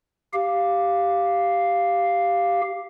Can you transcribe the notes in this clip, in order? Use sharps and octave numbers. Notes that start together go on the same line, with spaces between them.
G4 F5